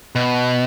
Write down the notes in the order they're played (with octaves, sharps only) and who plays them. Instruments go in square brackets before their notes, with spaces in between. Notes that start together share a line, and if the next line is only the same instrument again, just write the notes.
[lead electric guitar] B2